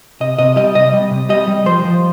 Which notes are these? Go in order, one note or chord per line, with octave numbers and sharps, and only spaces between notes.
C3 D#5
C3 D#5
G3 D#5
C3 D#5
G3
C3
G3 D#5
G3
F3 C5
F3